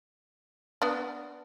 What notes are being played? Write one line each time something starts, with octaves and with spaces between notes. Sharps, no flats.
B3 D4